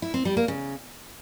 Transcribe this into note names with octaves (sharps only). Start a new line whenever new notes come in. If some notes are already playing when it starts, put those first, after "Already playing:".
E4
C4
G3
A#3
C#3